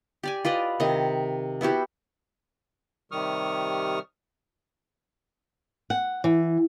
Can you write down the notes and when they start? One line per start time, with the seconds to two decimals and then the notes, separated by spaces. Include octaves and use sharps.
0.23 G4 D5 G#5
0.45 F4 B4 D5 D#5
0.80 C3 D#3 D#5
1.61 B3 E4 F#4 G4
3.12 C3 D#3 G3 C#6 D#6 F6
5.90 F#5
6.24 E3